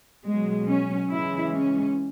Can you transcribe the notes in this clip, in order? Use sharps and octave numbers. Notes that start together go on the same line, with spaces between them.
B2 F#3 G#3
C#4
C#3 E3 G#3 E4
C#4